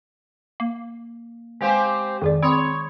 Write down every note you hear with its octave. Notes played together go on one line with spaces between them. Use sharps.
A#3
G#3 C4 G4 C5 F5 G#5
F2 D#3 G#4 D5
C4 C#5 B5 C6 D#6